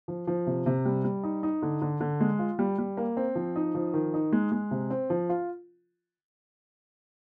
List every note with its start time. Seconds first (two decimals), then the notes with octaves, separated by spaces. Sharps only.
0.08 F3
0.27 F3
0.47 C3
0.66 C3
0.85 G3
1.04 G3
1.24 D#4
1.43 D#4
1.63 D3
1.82 D3
2.01 D3
2.21 G#3
2.39 F4
2.59 G3
2.78 G3
2.97 A#3
3.17 C4
3.35 F3
3.56 D#4
3.75 F3
3.94 D#3
4.14 D#4
4.33 G#3
4.52 G#3
4.71 C3
4.90 C4
5.10 F3
5.29 F4